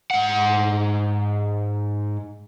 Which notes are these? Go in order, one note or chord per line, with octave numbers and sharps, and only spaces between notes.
G#2 F#5